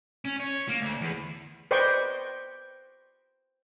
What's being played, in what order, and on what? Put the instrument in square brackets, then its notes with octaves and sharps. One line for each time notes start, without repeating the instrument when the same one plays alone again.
[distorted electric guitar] C#4
C#5
A#3
D2
E2
[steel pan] B4 C5 D5 D#5 G5 C#6